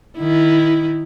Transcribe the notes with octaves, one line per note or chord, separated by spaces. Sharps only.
D#3 E4